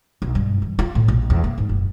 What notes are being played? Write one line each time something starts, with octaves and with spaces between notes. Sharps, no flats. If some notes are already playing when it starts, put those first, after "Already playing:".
B1
G2
E3
F4
A2
A#1
E2
A#3
G#2
F#1